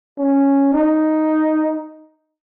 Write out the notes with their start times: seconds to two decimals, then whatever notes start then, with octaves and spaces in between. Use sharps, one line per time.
0.18 C#4
0.73 D#4